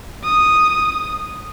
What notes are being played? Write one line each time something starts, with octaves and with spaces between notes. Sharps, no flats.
D#6